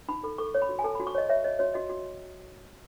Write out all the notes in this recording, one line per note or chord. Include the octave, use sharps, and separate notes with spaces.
D#4 B5
A4 B5
A4 C#6
C#5
B5
F#4
G#5
A4 A5
B5
F#4
C#6
C#5 D#5
C#5 E5
C#5 D#5
F#4 C#5
F#4 D#5
F#4